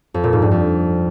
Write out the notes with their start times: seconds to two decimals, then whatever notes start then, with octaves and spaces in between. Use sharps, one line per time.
0.14 F2
0.24 A#2
0.33 G#2
0.42 G2
0.51 F2